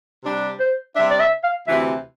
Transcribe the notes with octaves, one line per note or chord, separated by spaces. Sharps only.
C3 G3 D4
C5
C3 G3 D4 E5
D5
E5
F5
D2 C3 E3 E5